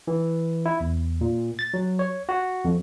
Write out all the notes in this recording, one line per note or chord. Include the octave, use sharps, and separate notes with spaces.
E3
E4
E2
A#2
A6
F#3
C#5
F#4
F2